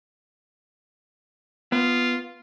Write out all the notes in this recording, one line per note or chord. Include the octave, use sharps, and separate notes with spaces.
B3 F4